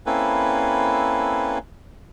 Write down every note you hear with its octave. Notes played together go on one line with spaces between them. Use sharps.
A#3 C4 C#4 E4 A4 B4